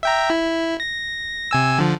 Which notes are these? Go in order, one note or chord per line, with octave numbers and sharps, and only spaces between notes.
E5 G5 A#5
E4
A#6
C3 G#5 E6
D3 F3